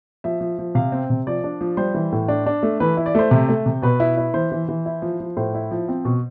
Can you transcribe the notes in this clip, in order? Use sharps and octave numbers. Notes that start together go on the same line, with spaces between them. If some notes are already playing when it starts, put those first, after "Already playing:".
F3 E5
F3
F3
C3 F5
C4
C3
F3 D5
D4
F3
G3 C5
E3
A2
D4
D4
A3
E3 B4
E4
D5
A3 C5
C3
A3
C3
B2 B4
E4
E4
E3 C5
E3
E3
E4
F3
F3
A2 C5
E4
F3
C4
B2